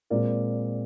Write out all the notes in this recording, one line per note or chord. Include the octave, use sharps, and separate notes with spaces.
A#2 G#3 C4 A#4 D5